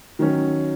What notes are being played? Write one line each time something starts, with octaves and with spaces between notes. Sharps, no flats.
D#3 F#3 C#4